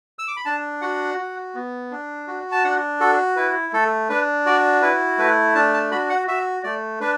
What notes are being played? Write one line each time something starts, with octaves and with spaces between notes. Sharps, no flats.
E6
D6
B5
D4 A5
F#4 F#5
F#4
B3
D4
F#4
A5
D4 F#5
F#4 A4
E4 B4
A3 A4
D4 B4
F#4 D5
E4 B4
A3 B4
D4 A5
A5
F#4 B5
F#5
F#4 E5
A3 D5
D4 B4